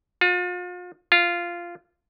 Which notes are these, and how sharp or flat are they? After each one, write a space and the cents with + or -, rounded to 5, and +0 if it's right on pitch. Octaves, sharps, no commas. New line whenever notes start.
F4 +40
F4 -10